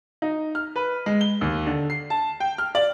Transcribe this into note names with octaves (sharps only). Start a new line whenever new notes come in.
D#4
F6
B4
G#3
G7
D#2
D3
C7
A5
G5
F6
D5